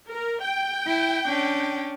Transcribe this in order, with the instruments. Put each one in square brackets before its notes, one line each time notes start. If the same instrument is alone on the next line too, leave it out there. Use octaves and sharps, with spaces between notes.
[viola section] A#4
G5
[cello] E4
C#4 D4